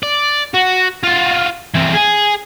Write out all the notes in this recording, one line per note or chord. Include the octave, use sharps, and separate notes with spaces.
D5
F#4
F4 F#4
E3 C4
G#4 G#5